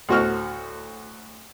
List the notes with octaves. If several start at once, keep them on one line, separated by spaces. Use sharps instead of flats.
D2 A2 F#4 C5 C#6 F6